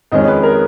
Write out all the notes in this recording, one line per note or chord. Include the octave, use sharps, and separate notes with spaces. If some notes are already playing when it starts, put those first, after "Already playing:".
F2 D#3 G#3 C#4 D#5
B4
A#4